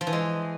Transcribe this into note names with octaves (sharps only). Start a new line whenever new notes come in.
F3
E3
G#3